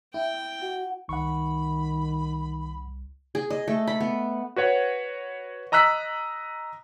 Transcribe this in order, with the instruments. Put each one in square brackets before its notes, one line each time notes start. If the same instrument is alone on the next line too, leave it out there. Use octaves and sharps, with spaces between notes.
[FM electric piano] E4 [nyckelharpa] G5
[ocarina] F#4 [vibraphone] F#5
[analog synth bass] C2 [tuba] D#3 [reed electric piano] F#5 C#6 [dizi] B5
[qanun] G#4
D#5
A3
B5
B3
[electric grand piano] F#4 B4 C#5 F#5
D#5 A#5 E6 F#6 B6